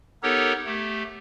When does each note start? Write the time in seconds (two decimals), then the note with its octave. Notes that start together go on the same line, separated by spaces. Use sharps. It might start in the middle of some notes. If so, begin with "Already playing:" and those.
0.23 B3 D#4 G4 A4 A#4 C#5
0.66 A3 G4